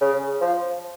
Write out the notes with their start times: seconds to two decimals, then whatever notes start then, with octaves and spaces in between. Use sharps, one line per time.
0.01 C#3
0.41 F3